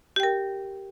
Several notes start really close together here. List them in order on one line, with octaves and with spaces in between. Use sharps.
G4 G5 A#4